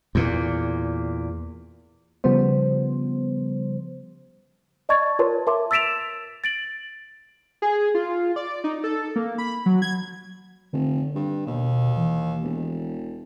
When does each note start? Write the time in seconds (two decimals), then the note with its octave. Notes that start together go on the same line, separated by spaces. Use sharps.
0.15 E2 A#2
2.24 C#3 F3 G3 B3 C5
4.89 D5 D#5 A5 C#6 G#6 A6
5.19 F4 A#4 B4 C#5 A5 C6
5.47 A#4 E5 A5 C6 D6
5.71 E6 A6 B6 D7 E7 F7
6.44 A6 D7 F#7
7.62 G#4
7.95 F4
8.36 D5
8.64 D#4
8.84 A4
9.16 A#3
9.38 B5
9.66 F#3
9.82 G#6
10.73 F1 D3
11.15 G2
11.47 D#2 B2
11.97 E3
12.43 E1